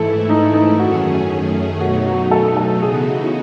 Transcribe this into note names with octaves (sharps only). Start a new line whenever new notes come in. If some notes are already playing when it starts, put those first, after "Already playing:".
Already playing: G#2 E3 A3 E4 A4
D#4
D#4
F#2 D#3 A3 C#4 F#4 G#4
B2 F#3 A3 D#4 F#4
F#4
A4
A4
C#3 E3 B3 D#4 F#4 G#4